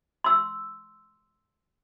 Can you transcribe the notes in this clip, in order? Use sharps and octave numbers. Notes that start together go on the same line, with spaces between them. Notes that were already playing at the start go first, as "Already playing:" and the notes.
C6 E6